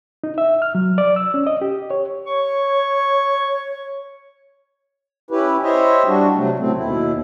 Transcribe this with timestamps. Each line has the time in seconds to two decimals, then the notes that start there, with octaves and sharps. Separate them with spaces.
0.24 D#4
0.38 E5
0.62 F6
0.75 F#3
0.98 D5
1.16 E6
1.34 C#4
1.47 D#5
1.61 G4
1.90 C#5
2.26 C#5 C#6
5.31 C#4 E4 G4 B4
5.63 E4 G4 C5 C#5 D#5 E5
6.07 G3 D4 F#4
6.35 C3 F#3 A3
6.59 A2 C#3 F#3 A3 C4
6.76 D#2 B2 E4